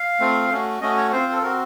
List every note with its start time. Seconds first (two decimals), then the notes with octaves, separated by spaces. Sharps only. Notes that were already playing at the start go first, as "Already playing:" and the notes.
Already playing: F5
0.20 A3 C4 F4
0.50 A3 C#4 F#4
0.81 A3 C#4 F#4 D#5
0.97 C#5
1.12 C4 F4 C5
1.32 A4
1.42 C4 F#4 A#4